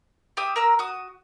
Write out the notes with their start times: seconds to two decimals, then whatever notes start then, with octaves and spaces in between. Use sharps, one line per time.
0.37 G4 E5 D6 D#6
0.56 A#4 A#5 E6
0.79 F#4 D#6